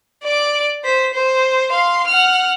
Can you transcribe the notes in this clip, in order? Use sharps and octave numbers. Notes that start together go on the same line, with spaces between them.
D5 D6
C5 B6
C5
F5 C6
F#5 F6